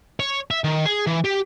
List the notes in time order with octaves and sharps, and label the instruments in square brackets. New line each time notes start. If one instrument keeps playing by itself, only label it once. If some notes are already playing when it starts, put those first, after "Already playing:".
[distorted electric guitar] C#5
E5
D#3
G#4
E3
G4